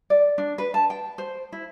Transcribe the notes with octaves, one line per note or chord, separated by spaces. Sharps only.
D5
D4
B4
A5
G5
C5
E4